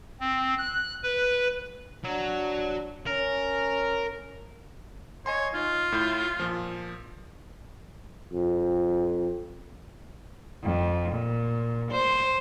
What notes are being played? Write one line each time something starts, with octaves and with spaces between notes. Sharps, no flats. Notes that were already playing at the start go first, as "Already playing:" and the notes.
C4
F#6
B4
F#3 D4
C#4 A#4
C#5 D#5 G#5 C6
D#4 F4 D#5
A2 E4 G6
A#2 F3
F2
F2
A#2
C5